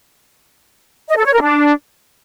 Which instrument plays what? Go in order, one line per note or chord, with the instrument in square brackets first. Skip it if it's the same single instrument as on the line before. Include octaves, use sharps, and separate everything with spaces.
[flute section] D#5
A4
C#5
A#4
D4